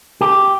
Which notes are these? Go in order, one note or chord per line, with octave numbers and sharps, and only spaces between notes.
G4